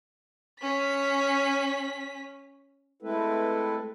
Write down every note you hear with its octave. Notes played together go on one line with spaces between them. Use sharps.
C#4 B6
G#3 A3 C4 E4 A4 B4